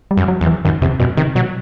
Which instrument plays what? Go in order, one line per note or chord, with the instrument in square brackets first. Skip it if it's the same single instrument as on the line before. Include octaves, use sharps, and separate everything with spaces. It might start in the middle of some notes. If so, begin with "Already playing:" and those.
[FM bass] G3
[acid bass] F#2
[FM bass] F#3
[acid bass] E2
[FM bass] E3
[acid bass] F#2 [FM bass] D#3
[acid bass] E2 [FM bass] C3
[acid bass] F#2 [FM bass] B2
[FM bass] C3 [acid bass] D#3
[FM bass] B2 [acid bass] F#3